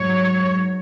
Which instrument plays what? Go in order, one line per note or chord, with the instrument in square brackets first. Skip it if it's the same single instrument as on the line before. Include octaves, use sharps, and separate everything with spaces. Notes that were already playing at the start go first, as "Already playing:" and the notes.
Already playing: [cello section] G#2 F#3 C#5